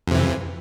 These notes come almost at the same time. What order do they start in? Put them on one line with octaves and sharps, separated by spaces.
F2 C3 E3